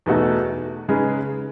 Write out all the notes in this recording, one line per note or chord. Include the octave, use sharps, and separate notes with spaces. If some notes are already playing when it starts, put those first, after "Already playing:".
E2 B2 A3 D#4 F#4
C#3 G#3 D#4 G#4 B4